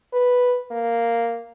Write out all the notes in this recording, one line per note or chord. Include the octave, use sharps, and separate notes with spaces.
B4
A#3